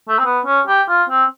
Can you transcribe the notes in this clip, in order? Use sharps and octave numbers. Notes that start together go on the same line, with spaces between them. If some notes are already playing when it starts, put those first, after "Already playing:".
A3
C4
B3
C#4
G4
F4
C4